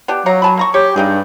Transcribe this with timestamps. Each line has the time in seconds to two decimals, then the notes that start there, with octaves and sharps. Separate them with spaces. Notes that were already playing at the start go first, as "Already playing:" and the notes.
0.08 B3 D4 G4
0.26 F#3 C#5 F5 A#5
0.42 G#5 A5 B5
0.57 A#3 A#5 C#6
0.74 G4 C#5
0.96 G2 D#4 G4 G#4